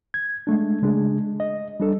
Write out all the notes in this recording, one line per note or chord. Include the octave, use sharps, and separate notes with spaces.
G#6
G#3 A3 D4
C#3 G#3 D4 G#4
D#5
G3 D4 A4